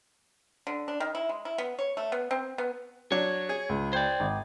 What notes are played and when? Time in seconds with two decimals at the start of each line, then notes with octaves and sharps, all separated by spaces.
0.67 D3
0.88 D4
1.00 D#3
1.15 E4
1.29 G#3
1.45 E4
1.58 B3
1.79 C#5
1.97 A3
2.12 B3
2.31 C4
2.58 B3
3.12 F#3 D4 C#5
3.49 G#4
3.69 C#2
3.93 C5 D5 G5 G6 G#6
4.20 G#1